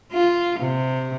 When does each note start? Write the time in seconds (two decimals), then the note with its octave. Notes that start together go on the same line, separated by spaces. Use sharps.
0.12 F4
0.59 C3